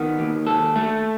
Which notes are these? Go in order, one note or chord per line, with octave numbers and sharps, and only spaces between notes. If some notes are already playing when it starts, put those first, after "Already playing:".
Already playing: D#3 B3
D#2
A4
A3